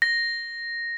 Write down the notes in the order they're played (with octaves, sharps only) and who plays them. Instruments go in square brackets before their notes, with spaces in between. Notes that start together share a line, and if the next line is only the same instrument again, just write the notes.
[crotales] A#6